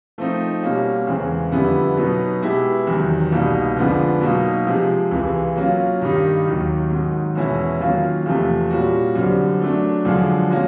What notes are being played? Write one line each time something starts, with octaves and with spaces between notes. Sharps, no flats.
F3 A3 C4 D#4
B2 G3 A#3 C#4
E2 C#3 E3 G#3 C4
F2 D3 G3 B3 E4
B2 F#3 B3 D#4
B2 G#3 B3 E4 G4
E2 C3 D#3 F#3
C2 B2 G3 A#3 D#4
F2 D3 F3 G#3 B3
B2 F#3 A#3 D#4
C3 F3 G#3
C#2 C3 E3 G#3
F#3 A#3 C#4 F4
G2 D#3 G3 A#3 D#4
D#2 D#3 F#3
G#2 D#3 F#3
E2 B2 G#3 C#4 E4
D#3 F#3 A#3 C#4 F4
E2 C3 F3 A3
A#2 G3 A#3 C#4 F#4
F#2 D3 G3 C4
F#3 A3 D4
F#2 D3 F3 G#3
F#3 A#3 C#4